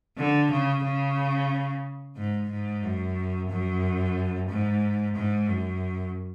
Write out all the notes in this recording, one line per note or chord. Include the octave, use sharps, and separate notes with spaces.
D3
C#3
C#3
G#2
G#2
F#2
F#2
G#2
G#2
F#2